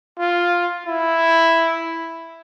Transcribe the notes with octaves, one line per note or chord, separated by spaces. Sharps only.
F4
E4